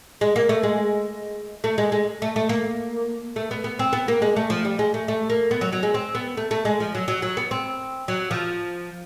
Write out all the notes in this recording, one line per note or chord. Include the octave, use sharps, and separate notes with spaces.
G#3
A#3
A3
G#3
A3
G#3
G#3
A3
A3
A#3
A3
B3
B3
C4
B3
A#3
G#3
A3
F3
G3
G#3
A3
A3
A#3
B3
F#3
F#3
G#3
C4
B3
A3
A3
G#3
F3
F#3
F#3
F#3
B3
C4
F#3
F3